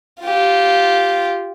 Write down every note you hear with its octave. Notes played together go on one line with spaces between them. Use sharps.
F4 G4